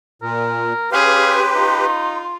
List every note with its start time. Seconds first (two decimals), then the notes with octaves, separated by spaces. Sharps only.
0.22 A#2 A#4
0.92 C#4 G4 G#4 B4 F5 C6
1.54 D#4 F4